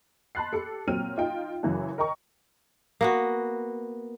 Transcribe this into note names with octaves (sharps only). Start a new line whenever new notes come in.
A5 B5 C6 F#6 A6 C7
G4 A4 C#7
A#2 F#3 C4 G5 F6 D#7
D#4 F4 D#5 G5
F#2 C#3 E3 F#3
A#4 D#5 G5 A#5 C#6
A#3 B3 F#4